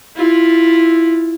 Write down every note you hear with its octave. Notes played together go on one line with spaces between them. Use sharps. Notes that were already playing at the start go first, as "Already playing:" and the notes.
E4 F4